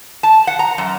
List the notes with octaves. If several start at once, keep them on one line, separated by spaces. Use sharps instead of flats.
A5
F#5
A#5
F#2